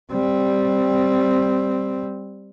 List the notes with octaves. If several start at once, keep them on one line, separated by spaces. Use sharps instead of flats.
G3 C4